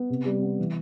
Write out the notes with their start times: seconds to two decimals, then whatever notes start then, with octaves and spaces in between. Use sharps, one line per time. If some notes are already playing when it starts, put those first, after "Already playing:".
Already playing: B3
0.10 C3
0.25 G3
0.42 B3
0.59 E3